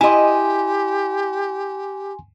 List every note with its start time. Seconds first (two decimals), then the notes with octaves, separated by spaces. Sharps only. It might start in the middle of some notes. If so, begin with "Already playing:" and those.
0.01 E4 G4 D#5 G#5 C6